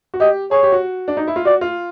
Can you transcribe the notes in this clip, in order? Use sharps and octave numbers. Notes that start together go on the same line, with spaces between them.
F#4
G4 D#5
G#4 C#5
G4
F#4
D4
D#4
E4
F4
F#4 D5
F4